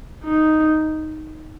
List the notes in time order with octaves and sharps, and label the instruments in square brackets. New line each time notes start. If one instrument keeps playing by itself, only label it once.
[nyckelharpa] D#4